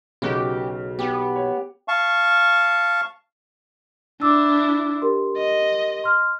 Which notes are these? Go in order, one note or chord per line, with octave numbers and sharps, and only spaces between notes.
B1 C#3 F#4 G4
B3 G4
C#5
F5 A5 C#6
D4 E4 D6 E6
G4 A#4 C6
D#5
C6 F6